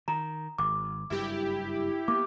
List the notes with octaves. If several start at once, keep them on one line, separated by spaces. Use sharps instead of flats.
D#3 A#5
G#1 D6
F#1 G2 G3 E4 G4
A#3 B3 D6